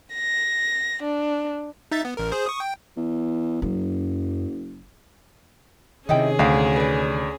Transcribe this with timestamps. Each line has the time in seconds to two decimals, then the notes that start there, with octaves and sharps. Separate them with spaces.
0.13 A#6
1.02 D4
1.92 D#4 E5 A6
2.05 B3
2.17 A1 A#4
2.32 G#4 C5
2.46 C#6 D#6
2.60 G5
2.97 E2
3.62 F#1 F#2
6.09 C3 D#3 C#4 D#4 E4 G#4 G5
6.39 D2 D4 F5 G5
6.76 B4 D5